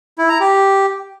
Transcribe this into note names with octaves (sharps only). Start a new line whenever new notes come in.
E4
A#5
G4